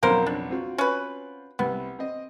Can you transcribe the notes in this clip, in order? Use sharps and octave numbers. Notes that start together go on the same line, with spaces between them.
B1 F2 C#3 A#3 A#4 C5
D4
C4 F4 F#4
C#4 B4
C2 B3
C4 D#5